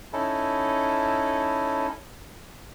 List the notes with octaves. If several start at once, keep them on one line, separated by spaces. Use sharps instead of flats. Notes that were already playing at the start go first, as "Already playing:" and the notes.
C#4 D#4 E4 A4